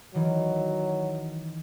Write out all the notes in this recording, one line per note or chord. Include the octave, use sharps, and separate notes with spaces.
D#3 E3 F#3